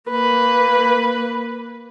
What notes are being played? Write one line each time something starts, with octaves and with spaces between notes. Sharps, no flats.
A#3 B4